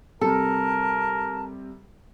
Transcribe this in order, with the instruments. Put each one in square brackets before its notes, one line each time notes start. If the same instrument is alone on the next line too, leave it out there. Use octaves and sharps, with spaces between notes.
[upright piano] C3 G3 C4 [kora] A4 [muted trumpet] A#4 [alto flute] A5